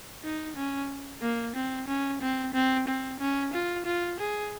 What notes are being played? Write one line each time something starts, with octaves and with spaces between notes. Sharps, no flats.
D#4
C#4
A#3
C4
C#4
C4
C4
C4
C#4
F4
F4
G#4